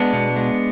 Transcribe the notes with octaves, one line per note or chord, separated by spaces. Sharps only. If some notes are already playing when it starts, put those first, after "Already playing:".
Already playing: G#3 B3 D4
B2
G#3